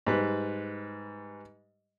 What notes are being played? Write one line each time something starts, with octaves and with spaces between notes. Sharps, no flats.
G#2 G3 B4 F#6